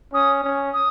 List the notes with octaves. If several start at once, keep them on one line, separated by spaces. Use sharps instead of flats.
C#4 D#6
C#4
D#6